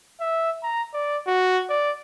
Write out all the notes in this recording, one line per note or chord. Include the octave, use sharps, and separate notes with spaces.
E5
A#5
D5
F#4
D5